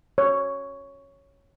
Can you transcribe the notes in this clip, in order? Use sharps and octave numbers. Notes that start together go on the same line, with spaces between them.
C#5